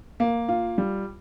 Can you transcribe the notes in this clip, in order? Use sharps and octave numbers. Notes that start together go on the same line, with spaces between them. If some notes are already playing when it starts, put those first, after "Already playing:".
A#3
F4
G3